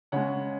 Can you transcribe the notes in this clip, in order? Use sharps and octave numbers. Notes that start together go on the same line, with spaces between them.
C#3 G#3 C#5 F#5